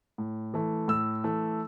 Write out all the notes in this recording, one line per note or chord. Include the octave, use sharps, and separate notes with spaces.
A2
E3 A3
A2 E6
E3 A3